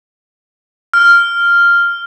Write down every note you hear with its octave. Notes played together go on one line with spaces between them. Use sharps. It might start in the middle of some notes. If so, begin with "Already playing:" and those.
F6